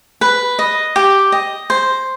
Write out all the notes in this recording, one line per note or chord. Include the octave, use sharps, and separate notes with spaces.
B4
D#5
G4
D#5
C5